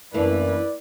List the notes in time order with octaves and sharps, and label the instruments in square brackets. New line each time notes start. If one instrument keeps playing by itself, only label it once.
[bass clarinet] F#2 [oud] E3 A#3 D4 [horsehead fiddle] E4 B4 [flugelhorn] D5